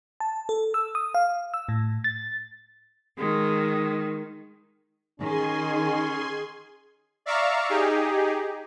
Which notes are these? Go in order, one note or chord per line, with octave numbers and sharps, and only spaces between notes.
A5
A4
E6
D#6
F5
E6
A2
A6
D#3 G#3
D#3 C#4 G#4 G#5 C6
D5 E5 F5 A#5 C#6
D#4 G4 G#4